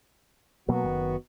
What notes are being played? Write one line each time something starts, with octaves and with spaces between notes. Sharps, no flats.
B2 F#3 A#3 B3 F#4
F#1 D#3